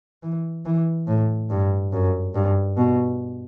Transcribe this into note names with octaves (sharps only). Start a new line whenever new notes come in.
E3
E3
A2
G2
F#2
G2
B2